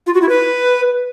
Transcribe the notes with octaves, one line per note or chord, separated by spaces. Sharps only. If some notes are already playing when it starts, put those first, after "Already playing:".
F4
F#4
E4
B4